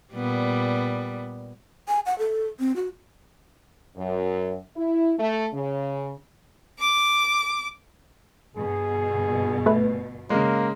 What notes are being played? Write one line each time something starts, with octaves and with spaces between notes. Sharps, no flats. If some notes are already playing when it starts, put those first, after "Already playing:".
A#2 G3 B3
G#5
F#5
A4
C4
F#4
F#2
E4
A3
C#3
D6
G1 B2 G#4
A3 B4
C#3 G#3 A#3